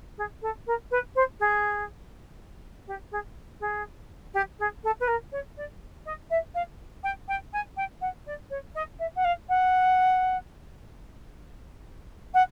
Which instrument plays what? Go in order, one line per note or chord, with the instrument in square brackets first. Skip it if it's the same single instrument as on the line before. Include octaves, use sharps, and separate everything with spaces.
[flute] G#4
A4
A#4
B4
C5
G#4
G4
G#4
G#4
G4
G#4
A4
B4
A#4
C#5
D5
D#5
E5
F5
G5
G5
G#5
G5
F#5
D5
C#5
D#5
E5
F#5
F5
F#5
F#5